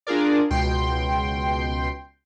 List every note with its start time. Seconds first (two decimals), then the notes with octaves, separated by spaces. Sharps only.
0.07 D4 F4 G#4 A#4 D5
0.50 C#2 B2 G5 C6